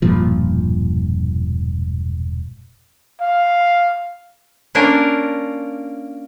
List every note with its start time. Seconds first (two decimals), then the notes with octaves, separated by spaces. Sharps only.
0.02 E1 G2 A#2 F3
3.21 F5
4.75 A#3 C#4 D4 F4 A#4